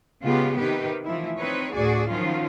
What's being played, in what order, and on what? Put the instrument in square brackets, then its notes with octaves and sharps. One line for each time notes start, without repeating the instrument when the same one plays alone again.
[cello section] C#3 G#3 B3 F4 G4
C3 D#3 G4 B4
E3 F3 A3 E4
C4 D#4 B4 C#5
D2 A2 F#4 G#4 D5
D#3 F3 F#3 C#4 F4